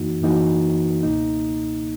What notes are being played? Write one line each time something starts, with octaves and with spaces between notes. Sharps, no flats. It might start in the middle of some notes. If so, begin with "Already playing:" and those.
Already playing: F#2 E3 A#3 D#4 F#4
F#2 E3 A#3 D#4 F#4
C#2 B2 A#3 D#4